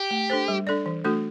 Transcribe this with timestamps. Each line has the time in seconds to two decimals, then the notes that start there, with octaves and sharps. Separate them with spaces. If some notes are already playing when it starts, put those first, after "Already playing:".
Already playing: G4
0.11 A3
0.30 D4 A4 C5
0.48 G3
0.67 D4 A4 D5
0.86 E3
1.04 A3 D4 F#4 A4